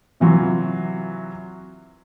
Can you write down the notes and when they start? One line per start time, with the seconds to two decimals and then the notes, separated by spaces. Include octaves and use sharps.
0.20 C3 E3 F#3 F4